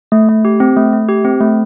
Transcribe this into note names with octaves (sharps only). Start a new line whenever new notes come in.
A3
A3
G4
C4
A3
A3
G4
C4
A3